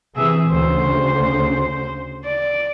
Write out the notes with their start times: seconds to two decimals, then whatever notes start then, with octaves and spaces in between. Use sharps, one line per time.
0.16 C3 E3 G#4 E5
0.51 D2 C#3 C5
2.25 D5